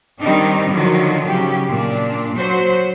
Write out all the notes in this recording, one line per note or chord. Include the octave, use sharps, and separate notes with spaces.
D#3 G3 C4 D4 D#4
D3 D#3 F3 F#3
C#3 F#3 G4
A#2 D4
F#3 F#4 C5